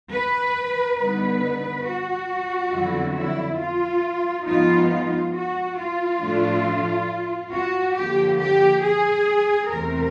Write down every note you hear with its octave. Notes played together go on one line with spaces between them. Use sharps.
B4
D3 G3 B3 D#4 B4
F#4
F2 D3 F#3 B3 E4
E4
F4
G#2 F3 G#3 B3 D#4 F4
F4
F#4
F4
A2 F3 A3 D4
F#4
D3 F3 A#3 G4
G4
G#4
E2 C3 E3 A3 C4 A#4